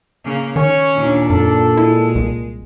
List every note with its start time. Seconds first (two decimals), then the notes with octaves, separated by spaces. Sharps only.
0.24 C#3 A#3
0.56 D#3 C#4 C#5
0.95 D#2 A#2 D4
1.30 F#2 A4
1.77 G#3 E4
2.15 C2